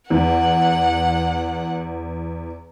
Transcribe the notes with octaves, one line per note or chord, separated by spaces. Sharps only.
E2 F#5